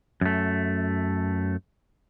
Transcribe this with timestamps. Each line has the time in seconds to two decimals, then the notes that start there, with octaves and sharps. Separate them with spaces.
0.21 F#2 A3